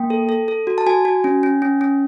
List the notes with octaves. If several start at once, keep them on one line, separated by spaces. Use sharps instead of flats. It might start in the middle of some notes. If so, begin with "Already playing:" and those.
Already playing: A#3 G5
A4
A4
A4
F#4
A5
F#4 G#5
F#4
C#4
C#4
C#4
C#4